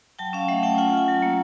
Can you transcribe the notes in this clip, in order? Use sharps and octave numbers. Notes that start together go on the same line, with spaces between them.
F#3 G5 A5
C#4 F5 G5
A3 E5 F#5
C#4 G5 A5
F4 F#5 G#5
F4 F#5 G#5
F#3
A#3